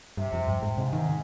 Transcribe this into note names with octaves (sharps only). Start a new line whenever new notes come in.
G2 C3
F2
G2
G#2
G#2 C3
D#3